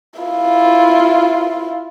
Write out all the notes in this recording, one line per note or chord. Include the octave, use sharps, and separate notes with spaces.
E4 F4